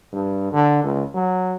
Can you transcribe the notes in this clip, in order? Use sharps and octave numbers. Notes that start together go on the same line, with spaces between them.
G2
D3
C#2
F#3